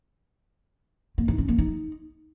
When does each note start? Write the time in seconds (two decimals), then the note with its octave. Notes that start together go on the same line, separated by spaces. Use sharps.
1.18 A#3
1.28 D#4
1.38 C#4
1.48 A#3
1.58 D#4